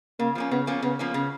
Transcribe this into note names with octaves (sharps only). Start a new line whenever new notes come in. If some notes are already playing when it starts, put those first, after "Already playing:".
C#3 A#3
F3 A#3 C#4
C#3 B3
F3 A#3 C#4
C#3 B3
F3 A#3 C#4
C#3